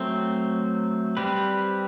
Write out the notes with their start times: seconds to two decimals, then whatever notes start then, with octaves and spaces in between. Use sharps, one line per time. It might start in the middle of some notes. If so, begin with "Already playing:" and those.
Already playing: F#3 A3 C4
1.17 G3 C4 G4 B4